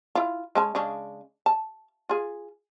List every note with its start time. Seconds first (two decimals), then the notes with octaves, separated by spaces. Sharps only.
0.15 E4 F4
0.55 G#3 C#4 A5
0.75 C#3 G#3 D4
1.46 A5
2.09 F4 G#4